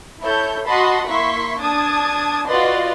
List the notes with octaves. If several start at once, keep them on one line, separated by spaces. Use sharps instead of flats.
E4 A4 C#5 G6
F#4 D#5 F#5 A5 B5 C6
A#3 E4 C6 C#6 B6
D4 A5 D#6 G#6
F4 F#4 B4 D5 D#5 C6